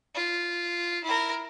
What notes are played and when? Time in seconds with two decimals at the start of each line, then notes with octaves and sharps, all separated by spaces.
0.15 F4
1.04 E4 A#4